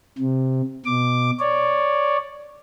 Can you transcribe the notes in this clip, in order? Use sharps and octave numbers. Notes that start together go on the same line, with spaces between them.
C3
B2 D6
C#5 D5